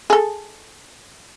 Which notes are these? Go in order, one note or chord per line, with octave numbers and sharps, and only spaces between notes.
G#4 A4